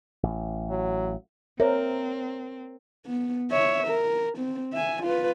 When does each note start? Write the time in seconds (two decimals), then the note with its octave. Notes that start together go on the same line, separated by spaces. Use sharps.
0.23 A1
0.69 F#3
1.60 C4 A#4 C5 C#5 E5
3.06 B3
3.51 C#5 E5
3.87 A#4
4.38 C4
4.73 E5 G#5
5.03 F4 B4